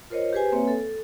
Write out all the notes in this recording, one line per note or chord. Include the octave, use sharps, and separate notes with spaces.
F4 A#4 C5 C#5 D#5
G4 G#4 B4 C5 G#5
A#3 C4 B4 C#5 E5 G#5
A4